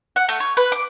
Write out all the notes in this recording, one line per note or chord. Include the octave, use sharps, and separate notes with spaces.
F#5
A3
C#5
B4
D6